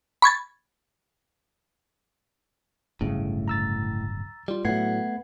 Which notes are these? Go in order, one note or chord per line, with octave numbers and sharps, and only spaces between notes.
B5 C#6 G#6 A6
D1 G1 A2 C#3
A#5 E6 A6
G3 F4
A2 F#3 A3 B3 F#5 G#6 C7